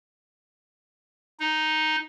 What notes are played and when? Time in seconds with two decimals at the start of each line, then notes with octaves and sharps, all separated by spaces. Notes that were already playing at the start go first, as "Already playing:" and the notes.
1.40 D#4